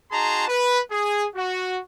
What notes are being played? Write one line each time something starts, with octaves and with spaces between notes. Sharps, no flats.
D#4 F#4 G#4 A5 A#5 C6
B4
G#4
F#4